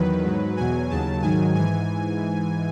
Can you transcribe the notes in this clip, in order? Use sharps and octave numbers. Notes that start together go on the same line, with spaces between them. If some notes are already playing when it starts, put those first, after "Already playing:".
Already playing: E2 D#3 F#3 B4
G#2 F#3
E2 B2 F#3 G#5
D#2 C#3 F#3 A5
G#2 D#3 F#3 G#5
G#2 E3 G#5